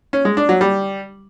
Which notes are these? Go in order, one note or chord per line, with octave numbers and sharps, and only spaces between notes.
C#4
G#3
D4
F#3
G3